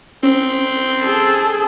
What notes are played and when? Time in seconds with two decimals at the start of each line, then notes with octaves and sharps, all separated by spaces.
0.23 C4 C#4
1.02 G#4 A4